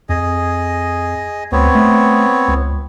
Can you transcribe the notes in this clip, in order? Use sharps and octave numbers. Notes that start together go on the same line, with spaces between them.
F2 G#4 D#5
D2 B3 C4 C#5
A3
C#2